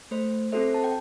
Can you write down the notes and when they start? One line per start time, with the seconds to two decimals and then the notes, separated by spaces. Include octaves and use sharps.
0.11 A3 C5
0.52 C4 F#4 A4 C5 E5
0.74 A5
0.84 G5